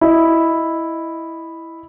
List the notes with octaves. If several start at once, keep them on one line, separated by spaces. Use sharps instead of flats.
E4 D#5